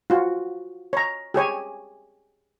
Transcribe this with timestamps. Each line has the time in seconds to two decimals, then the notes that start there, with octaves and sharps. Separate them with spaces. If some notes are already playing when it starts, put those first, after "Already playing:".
0.10 F4 F#4
0.93 C#5 A#5
1.34 G4 G#4 C#5 G#5